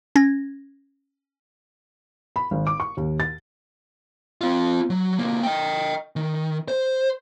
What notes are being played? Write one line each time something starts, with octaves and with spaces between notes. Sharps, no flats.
C#4 G#6 A#6
B5
G#1
D6
C#6
D#2
A6
C4 F4
F#3
C#2 A#3
D#5 G5
D#3
C5